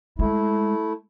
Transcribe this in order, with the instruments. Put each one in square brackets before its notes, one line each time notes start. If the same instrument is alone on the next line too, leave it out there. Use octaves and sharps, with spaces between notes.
[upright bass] G#3 [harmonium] A3 E4